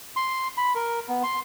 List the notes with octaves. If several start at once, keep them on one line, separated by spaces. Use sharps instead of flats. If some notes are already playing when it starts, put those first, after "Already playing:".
C6
B5
A#4
B3
C6